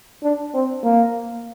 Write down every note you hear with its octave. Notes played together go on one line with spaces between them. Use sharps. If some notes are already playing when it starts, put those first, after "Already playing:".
D4
C4
A#3